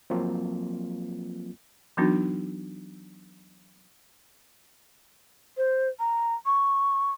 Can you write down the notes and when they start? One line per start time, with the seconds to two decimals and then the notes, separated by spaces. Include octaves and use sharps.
0.10 F3 F#3 A#3 C4 F4
1.97 E3 F#3 B3 D4 D#4 F#4
5.57 C5
6.00 A#5
6.46 C#6